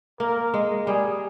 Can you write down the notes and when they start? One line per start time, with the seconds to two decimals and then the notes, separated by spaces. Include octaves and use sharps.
0.20 A#3 A#4
0.54 G#3
0.86 G3 G#4